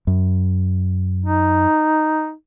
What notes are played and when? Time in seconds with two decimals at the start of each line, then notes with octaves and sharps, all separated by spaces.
0.07 F#2
1.25 D#4